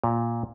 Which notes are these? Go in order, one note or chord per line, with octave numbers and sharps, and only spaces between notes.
A#2